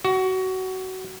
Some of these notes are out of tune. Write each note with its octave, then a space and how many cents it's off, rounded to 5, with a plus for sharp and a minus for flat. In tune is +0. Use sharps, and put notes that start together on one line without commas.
F#4 +20